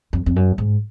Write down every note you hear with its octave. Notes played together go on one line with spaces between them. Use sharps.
F2
F2
F#2
G#2